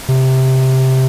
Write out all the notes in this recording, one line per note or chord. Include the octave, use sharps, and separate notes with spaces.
C3